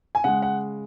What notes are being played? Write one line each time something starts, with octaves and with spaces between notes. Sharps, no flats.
G#5
C#3 G#3 F#5
F#5